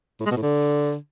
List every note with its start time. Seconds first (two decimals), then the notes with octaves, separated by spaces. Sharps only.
0.20 A2
0.26 G#3
0.31 B2
0.37 A2
0.42 D3